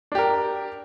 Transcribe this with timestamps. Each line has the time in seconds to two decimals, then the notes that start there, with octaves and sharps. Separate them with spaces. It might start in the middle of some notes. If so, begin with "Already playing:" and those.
0.12 D4
0.15 G4
0.18 A#4